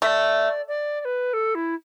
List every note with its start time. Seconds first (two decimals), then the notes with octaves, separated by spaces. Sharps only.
0.02 A3 E5
0.06 D5
0.67 D5
1.00 D5
1.04 B4
1.33 A4
1.54 E4